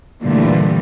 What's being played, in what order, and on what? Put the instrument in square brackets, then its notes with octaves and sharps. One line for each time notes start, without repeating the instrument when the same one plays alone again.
[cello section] A#2 D3 E3 G3 A3